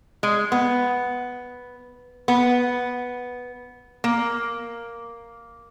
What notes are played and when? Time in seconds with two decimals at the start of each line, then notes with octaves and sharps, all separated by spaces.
0.23 G#3
0.52 B3
2.28 B3
4.04 A#3